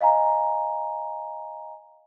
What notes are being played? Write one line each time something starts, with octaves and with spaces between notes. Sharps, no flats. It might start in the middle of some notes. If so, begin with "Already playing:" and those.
D#5 F5 G#5 A#5